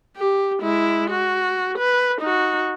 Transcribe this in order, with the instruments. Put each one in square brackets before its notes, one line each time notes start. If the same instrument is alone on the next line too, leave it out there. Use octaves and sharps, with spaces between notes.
[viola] G4
G#3 E4
F#4
B4
D#4 F#4